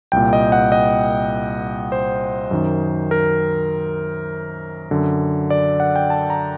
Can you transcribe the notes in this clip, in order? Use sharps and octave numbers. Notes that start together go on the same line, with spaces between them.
C2 A#2 G5
D#5
F#5
D#5
C5
F#2 D#3
A#4
F#2 D3
D5
F#5
G5
A5
A#5